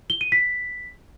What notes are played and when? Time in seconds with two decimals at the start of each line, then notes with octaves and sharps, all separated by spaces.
0.10 G7
0.21 D#7
0.32 B6